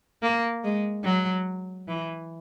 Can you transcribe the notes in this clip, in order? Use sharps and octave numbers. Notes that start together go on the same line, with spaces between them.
A#3
G#3
F#3
E3